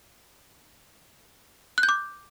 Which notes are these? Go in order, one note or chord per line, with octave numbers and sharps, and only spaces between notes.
F#6
G6
D6